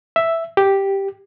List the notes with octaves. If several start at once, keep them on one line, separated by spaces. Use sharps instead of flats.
E5
G4